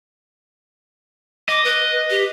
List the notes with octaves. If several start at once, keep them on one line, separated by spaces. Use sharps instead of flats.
D#5 D6
B4
G4